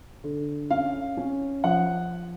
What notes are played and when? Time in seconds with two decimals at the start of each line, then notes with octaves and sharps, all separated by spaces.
0.24 D3
0.70 C#4 F5
1.17 C#4
1.64 F3 F#5